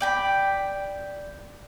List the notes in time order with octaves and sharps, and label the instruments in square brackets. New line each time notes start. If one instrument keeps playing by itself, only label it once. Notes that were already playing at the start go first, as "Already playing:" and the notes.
[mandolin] D5 G5 B5